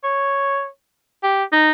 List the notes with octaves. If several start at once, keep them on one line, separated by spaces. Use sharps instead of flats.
C#5
G4
D#4